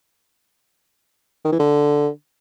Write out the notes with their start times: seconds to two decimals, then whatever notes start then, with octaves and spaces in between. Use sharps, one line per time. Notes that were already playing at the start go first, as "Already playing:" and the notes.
1.45 D#3
1.52 E3
1.59 D3